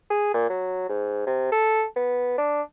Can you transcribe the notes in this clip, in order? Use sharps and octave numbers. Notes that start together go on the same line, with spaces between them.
G#4
A#2
F#3
G#2
C3
A4
B3
D4